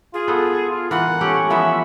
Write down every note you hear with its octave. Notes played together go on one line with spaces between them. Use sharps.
F4 G#4
B3 A4
F4
E3 A#4 F#5
A3 C#4 G4
E3 F3 B3 E5